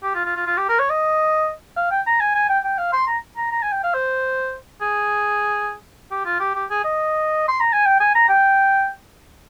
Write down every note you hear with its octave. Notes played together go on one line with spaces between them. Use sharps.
G4
F4
F4
F4
F4
G4
A#4
C#5
D#5
F5
G5
A#5
G#5
G#5
G5
G5
F5
C6
A#5
A#5
A#5
G#5
G5
F5
C5
G#4
G4
F4
G4
G4
G#4
D#5
C6
A#5
G#5
G5
G#5
A#5
G5